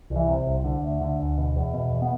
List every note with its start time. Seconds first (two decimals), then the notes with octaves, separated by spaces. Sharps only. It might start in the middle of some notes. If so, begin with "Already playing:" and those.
0.10 C2
0.16 E3
0.28 C3
0.46 C2
0.64 D3
0.83 D2
1.01 D3
1.19 D2
1.38 B2
1.56 E2
1.74 B2
1.92 E2
2.02 B3